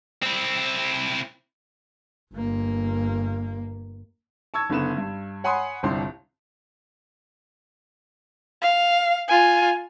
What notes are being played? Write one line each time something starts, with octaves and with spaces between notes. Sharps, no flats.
C4 E4
G1 A#3
A5 C#6 E6 G#6
F#1 D3 B3 E7
G2
C#5 F#5 G#5 B5 C6 D#6
G1 C2 C4 D4 C6
F5
F4 G#5